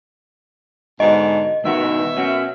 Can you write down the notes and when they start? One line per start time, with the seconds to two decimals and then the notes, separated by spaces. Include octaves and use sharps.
1.00 G#2 B2 D3 D#5
1.64 G2 B2 D#3 F#4 E5
2.17 C#4 F#4